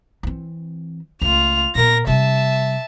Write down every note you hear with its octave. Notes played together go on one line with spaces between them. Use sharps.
E3 C4
C#2 A3 F4 F7
A#2 B3 A#4 A#6
C3 G3 E5 A5